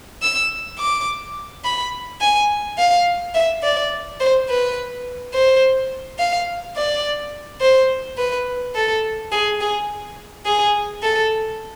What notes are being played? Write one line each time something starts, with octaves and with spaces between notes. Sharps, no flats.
E6
D6
B5
G#5
F5
E5
D5
C5
B4
C5
F5
D5
C5
B4
A4
G#4
G#4
G#4
A4